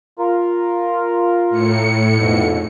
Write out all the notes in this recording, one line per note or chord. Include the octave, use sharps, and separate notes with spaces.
F4 A#4
A2 C#7
F2 G#2 B2